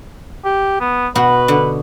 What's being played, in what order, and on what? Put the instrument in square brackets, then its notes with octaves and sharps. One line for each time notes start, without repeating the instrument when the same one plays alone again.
[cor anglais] G4
B3
[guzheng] B2 F#4 [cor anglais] B4
[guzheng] D3